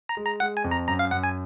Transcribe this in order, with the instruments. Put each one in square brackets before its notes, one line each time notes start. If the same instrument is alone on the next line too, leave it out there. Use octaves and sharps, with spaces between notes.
[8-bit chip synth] A#5
[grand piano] G#3
[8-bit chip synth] A#5
[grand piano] G#3 [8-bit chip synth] F#5
[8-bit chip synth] G#5
[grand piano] F2
[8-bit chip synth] A#5
[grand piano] F#2 [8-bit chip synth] A#5
[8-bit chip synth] F5
[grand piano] F#2 [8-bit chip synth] F#5
[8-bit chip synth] G#5